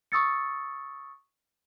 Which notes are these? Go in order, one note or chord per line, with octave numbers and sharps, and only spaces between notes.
C#6 D#6 E6 A6 C#7